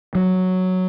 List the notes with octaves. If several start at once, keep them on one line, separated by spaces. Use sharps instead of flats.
F#3